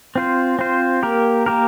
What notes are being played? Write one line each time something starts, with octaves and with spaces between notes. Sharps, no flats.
C4 F4 C5
C4 F4 C5
A#3 G4 A#4
A#3 G4 A#4